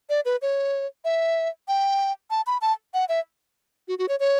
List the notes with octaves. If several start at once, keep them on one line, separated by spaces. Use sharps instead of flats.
D5
B4
C#5
E5
G5
A5
B5
A5
F#5
E5
F#4
F#4
C#5
C#5